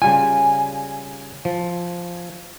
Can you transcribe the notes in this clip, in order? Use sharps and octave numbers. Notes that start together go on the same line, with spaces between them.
C#3 G3 F4 G#5
F3